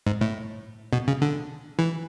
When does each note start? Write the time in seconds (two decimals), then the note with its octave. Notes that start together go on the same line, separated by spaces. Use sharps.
0.06 G#2
0.21 A2
0.93 B2
1.08 C#3
1.22 D3
1.79 E3